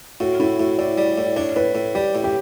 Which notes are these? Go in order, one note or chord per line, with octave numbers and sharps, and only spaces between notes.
A2 F#4
A2 E4
A2 F#4
A2 D5
G3
A2
D4 C#5
A2 B4
A2
G3 G4
A2
G4